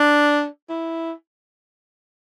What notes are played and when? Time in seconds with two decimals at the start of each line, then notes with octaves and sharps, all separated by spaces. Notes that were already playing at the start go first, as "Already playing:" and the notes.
Already playing: D4
0.69 E4